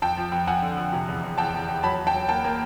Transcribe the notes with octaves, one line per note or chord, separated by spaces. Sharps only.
F2 G5 A5
F3
F2
F2 F#5 G#5
D3
F2
C3
E2
E2
E2 G5 A5
E2
E2
F#3 A5 B5
F#3
G5 A5
F#3
A#3 G5 A5
A#3